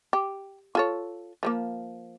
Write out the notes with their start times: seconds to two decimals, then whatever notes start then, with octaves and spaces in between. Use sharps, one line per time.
0.13 G4
0.75 F4 A4 C#5
1.43 F3 A3 A#3